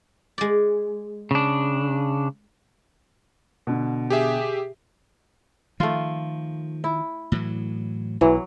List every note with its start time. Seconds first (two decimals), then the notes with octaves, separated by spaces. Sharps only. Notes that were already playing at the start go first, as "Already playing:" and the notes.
0.38 G#3 D5
1.31 C#3 D4
3.67 B2 D3
4.10 G4 G#4 E5
5.80 D#3 F3 A3 F4
6.84 E4
7.32 A2 E3 F#3
8.21 B1 E3 F#3